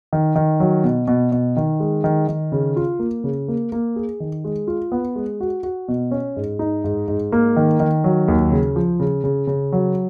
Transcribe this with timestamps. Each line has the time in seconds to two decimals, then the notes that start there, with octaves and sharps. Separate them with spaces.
0.13 D#3
0.36 D#3
0.60 F#3
0.84 B2
1.08 B2
1.32 B2
1.57 D#3
1.80 G#3
2.04 D#3
2.28 D#3
2.52 C#3
2.76 F4
2.99 A#3
3.24 C#3
3.48 A#3
3.72 A#3
3.96 G#4
4.20 D#3
4.44 G#3
4.67 F4
4.92 B3
5.16 G#3
5.40 F#4
5.63 F#4
5.88 B2
6.11 C#4
6.36 G#2
6.59 D#4
6.84 G#2
7.08 G#2
7.32 A#3
7.56 D#3
7.80 D#3
8.04 F#3
8.28 D#2
8.52 C#3
8.76 F3
9.00 C#3
9.24 C#3
9.47 C#3
9.72 F#3